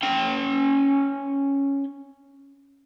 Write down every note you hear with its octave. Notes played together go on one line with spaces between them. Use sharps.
C#4 G5